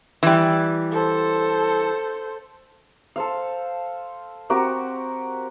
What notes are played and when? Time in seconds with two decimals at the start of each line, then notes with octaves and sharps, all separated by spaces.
0.23 E3 G3
0.92 A4 C5
3.16 A4 C5 F5
4.50 C4 F#4 G4 A#4